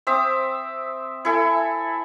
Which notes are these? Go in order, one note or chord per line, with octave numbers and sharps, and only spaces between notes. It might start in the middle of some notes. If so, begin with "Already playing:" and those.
C4 E5 D6 D#6
E4 A4 G#5